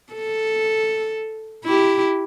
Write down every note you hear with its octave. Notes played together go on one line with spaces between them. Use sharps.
A4
E4 G4